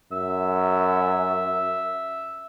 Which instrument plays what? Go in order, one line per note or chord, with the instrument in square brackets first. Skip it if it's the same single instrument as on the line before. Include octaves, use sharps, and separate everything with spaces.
[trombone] F#2 [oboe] E5